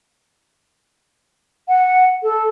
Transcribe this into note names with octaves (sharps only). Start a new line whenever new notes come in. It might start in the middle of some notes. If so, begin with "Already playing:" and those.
F#5
A4